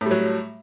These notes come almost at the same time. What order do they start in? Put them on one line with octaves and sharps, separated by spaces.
A2 G3 F#3